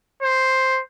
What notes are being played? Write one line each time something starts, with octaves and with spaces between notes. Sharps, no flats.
C5